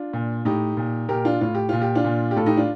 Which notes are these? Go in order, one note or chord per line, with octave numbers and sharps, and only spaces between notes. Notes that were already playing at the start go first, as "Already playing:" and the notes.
Already playing: D4 F4
A#2
A2 D#4 G4
A#2
A#2 G4 A#4
D4 F4
A2 F4
G4
A#2 F4
G4
D4 F4
A#2
G4
A2 F4 A4
D#4 G4
D4 F4